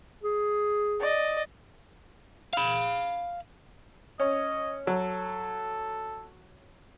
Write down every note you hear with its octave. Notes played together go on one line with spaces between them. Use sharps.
G#4
D5 D#5
F5 B5
C#4 D#5
F#3 A4